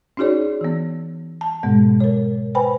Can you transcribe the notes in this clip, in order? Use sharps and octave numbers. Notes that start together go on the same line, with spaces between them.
C#4 D#4 F#4 G#4 C#5 D5
E3 B3
A5
G#2 B2 G#3 B3
A#4 C#5
B4 C5 G5 G#5 B5